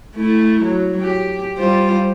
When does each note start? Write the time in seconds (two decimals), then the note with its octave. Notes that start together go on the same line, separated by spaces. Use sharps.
0.16 A3 E4
0.62 F#3
1.01 G4
1.57 G3 F4 C5